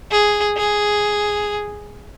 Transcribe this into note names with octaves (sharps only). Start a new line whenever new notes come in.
G#4
G#4